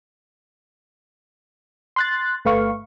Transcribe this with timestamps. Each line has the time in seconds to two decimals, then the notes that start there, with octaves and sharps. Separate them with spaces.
1.96 C6 F#6 A6
2.45 G1 A3 B4 F5 C#6